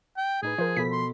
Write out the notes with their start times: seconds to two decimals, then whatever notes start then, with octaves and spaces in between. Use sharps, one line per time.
0.17 G5
0.43 A2 D#4 G#4 B4
0.58 F3 A#4 C5
0.77 B2 A4 B5 B6
0.92 C6